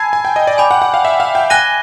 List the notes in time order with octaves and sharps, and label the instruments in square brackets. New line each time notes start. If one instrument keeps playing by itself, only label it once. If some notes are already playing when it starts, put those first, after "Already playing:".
Already playing: [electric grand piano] G#5 A5 [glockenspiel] B5 E6 G#6 C7
[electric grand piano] G#5
G5
D#5
D5
[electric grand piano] G5 [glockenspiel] G#5 B5 D6
[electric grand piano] F#5
F#5
F5
E5
F5
G5
[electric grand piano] G#5 [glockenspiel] F#6 A#6 D#7 G7